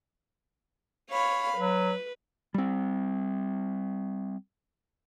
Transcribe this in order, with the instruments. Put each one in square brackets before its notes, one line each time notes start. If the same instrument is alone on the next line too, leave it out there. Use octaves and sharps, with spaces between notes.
[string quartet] C#5 F5 B5
[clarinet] F#3 [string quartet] B4
[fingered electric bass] G3 C4